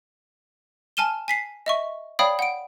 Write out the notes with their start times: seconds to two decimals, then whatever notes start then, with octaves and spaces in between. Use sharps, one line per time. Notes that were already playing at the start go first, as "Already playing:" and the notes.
0.97 G#5 A5 F6 D#7 E7 G7
1.28 G#5 B6 C7
1.66 D#5 E5 C#6
2.19 C#5 D5 F5 G5 B5 D#6
2.39 F#5 D7